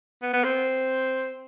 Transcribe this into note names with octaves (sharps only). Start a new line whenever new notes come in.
B3
B3
C4